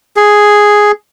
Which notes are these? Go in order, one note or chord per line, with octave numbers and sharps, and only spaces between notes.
G#4